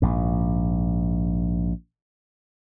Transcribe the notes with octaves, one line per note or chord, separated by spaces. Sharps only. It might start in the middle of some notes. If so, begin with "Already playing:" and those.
A#1 G#2